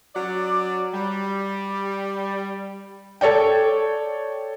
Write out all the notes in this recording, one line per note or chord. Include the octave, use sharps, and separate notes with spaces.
F#3 C#4 D5
G3
A4 C#5 D5 G5